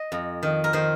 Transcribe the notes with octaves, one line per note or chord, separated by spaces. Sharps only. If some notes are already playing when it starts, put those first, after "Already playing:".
Already playing: D#5
F2
D#3
A#4
D#3 C5